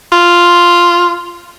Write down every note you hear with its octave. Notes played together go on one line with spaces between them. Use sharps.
F4